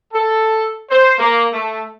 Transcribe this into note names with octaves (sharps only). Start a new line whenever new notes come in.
A4
C5
A#3
A3